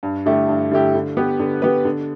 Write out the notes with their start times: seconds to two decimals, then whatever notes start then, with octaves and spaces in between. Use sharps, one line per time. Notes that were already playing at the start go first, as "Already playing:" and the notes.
0.03 G2
0.26 D3 A3 E4 G4
0.49 G2
0.71 D3 A3 E4 G4
0.94 D3
1.17 B3 G4 B4
1.40 D3
1.62 B3 G4 B4
1.85 D3